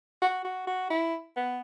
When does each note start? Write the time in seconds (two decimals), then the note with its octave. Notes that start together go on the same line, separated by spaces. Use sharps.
0.22 F#4
0.44 F#4
0.67 F#4
0.90 E4
1.37 B3